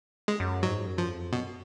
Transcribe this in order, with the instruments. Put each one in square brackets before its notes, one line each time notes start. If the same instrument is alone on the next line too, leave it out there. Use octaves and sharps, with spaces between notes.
[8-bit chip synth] G#3
[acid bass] F#2
[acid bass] G#2 [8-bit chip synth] F#3
[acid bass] F#2
[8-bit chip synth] F3
[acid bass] F2
[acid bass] F#2 [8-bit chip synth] B2